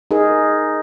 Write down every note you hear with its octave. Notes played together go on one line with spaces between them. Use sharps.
D#4 G#4 A#4